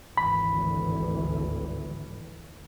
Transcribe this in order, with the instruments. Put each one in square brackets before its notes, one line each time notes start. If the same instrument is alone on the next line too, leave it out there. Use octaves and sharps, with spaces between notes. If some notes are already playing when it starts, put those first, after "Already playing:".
[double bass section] G#1 D2 E3 [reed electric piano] B5